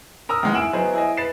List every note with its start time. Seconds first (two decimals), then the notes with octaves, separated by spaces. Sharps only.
0.29 A#4 A#5 D#6 E6
0.43 G#1 E3 G#3 F#5 F6
0.54 E4 G#4 E6 D7 E7 F#7
0.73 F#3 B3 G#4 C5 D#5
0.93 E4 G#4 D#5
1.17 B4 A6 C7 E7